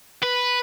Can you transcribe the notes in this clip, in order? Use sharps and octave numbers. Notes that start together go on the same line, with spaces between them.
B4